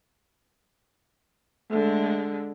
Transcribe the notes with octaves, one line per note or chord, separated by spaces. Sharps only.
D3 G#3 A3